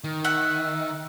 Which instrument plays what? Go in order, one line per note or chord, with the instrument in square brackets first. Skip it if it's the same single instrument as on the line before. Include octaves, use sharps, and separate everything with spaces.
[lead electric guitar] D#3
[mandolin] E5 F#5